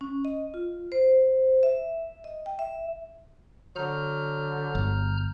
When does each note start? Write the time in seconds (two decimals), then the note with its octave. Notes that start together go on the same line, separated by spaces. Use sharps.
0.01 C#4
0.25 D#5
0.54 F4
0.92 C5
1.63 E5
2.24 D#5
2.46 G5
2.59 E5
3.76 D3 F#3 A#5 F6 G6
4.75 G1